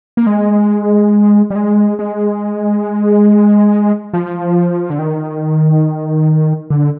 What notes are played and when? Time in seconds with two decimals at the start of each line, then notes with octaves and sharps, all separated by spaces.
0.17 A#3
0.27 G#3
1.50 G3
1.55 G#3
1.99 G#3
4.14 F3
4.90 D3
4.99 D#3
6.70 D3